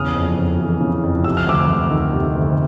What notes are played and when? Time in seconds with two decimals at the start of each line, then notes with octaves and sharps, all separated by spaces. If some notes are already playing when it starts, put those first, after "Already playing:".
Already playing: E2 C#3 D#6 F6
0.15 F2
0.38 F2
0.60 E3
0.81 C#3
1.03 F2
1.24 C3 E6
1.37 F6
1.46 D2 D6 E6
1.69 D2
1.91 D#3
2.13 C3
2.35 D2